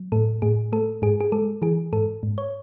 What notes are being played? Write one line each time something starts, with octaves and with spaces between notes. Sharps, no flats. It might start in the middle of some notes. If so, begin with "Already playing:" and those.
Already playing: F#3
A2 A4
A2 G#4
A3 A4
G#2 G#4
G#4
G#3 A4
E3 G#4
G#2 A4
G#2
C#5